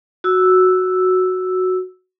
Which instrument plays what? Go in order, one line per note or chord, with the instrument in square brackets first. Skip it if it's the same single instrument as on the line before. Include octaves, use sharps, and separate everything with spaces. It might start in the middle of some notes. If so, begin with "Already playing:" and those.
[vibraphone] F#4 E6